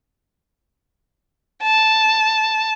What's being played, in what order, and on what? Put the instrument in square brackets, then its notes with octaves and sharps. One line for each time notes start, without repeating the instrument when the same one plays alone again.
[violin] A5